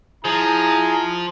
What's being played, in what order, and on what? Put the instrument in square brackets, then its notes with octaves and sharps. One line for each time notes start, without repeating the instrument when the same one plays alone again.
[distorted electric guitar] F3 [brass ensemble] E4 A#5 [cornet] G#4